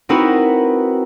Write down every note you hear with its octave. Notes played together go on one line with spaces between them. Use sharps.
C4 D#4 E4 F#4 A#4 B4